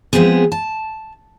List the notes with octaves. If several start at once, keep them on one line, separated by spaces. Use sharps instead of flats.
F3 G#3 B3 C4 G#4
A5